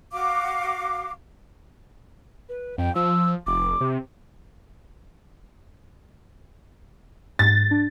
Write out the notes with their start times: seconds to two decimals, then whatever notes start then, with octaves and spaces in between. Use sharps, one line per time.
0.12 F#4 F5 D6
2.49 B4
2.78 F2 G5
2.95 F3 E6
3.47 F1 D6
3.81 C3
7.39 G#2 A6
7.71 D4